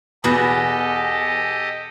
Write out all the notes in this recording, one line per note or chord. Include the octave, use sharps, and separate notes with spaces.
E2 B2 B3 F#4 G4 A4 D#5